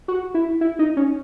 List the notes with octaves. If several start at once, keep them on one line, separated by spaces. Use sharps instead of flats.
F#4
E4
E4
D#4
C#4